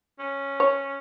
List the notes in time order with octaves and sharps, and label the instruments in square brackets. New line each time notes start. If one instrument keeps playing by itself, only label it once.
[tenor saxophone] C#4
[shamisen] C#5